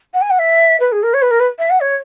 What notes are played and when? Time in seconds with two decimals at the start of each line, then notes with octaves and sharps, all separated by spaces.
0.13 F#5
0.21 G#5
0.30 F#5
0.38 E5
0.79 B4
0.91 G#4
1.02 A#4
1.13 C#5
1.21 B4
1.30 A#4
1.39 B4
1.58 E5
1.70 F#5
1.80 C#5